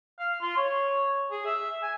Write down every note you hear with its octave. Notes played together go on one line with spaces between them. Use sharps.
F5
F4
C#5
G#4
E5
G#5